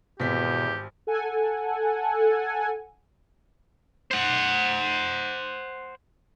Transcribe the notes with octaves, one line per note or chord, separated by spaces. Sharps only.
G#1 E2 B2 G4 B6
A4 F#5 G#5
C5 F#5